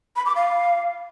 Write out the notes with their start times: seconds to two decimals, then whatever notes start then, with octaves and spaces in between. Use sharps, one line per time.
0.16 B5
0.26 D6
0.35 F5